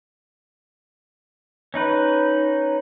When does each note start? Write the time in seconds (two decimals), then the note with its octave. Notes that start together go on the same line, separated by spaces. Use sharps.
1.74 C#4 D#4 B4